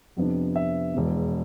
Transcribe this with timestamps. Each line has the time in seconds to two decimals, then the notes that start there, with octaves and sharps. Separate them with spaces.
0.16 F2 C3 F3 B3 D4
0.56 E5
0.94 E1 E2 B2